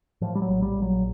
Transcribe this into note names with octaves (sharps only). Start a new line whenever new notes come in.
A2 F3
G3
F#3
A#1
G3
A#1
F#3